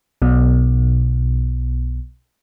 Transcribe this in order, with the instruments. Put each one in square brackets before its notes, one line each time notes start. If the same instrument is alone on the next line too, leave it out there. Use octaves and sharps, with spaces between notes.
[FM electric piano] B1 B2